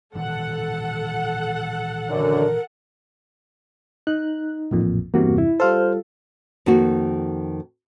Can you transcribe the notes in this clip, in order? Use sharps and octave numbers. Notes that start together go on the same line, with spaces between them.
A#2 D#3 E3 A4 F#5
F#2 D3 A#4
D#4 F#6
A1 F2 A#2
E2 G2 C3 A#3 F#4
E4
G3 F4 A4 C5 F6
F2 D#3 A#3 F#4